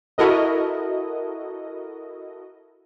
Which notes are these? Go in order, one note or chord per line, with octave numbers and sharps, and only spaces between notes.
E4 F#4 A4 A#4 D#5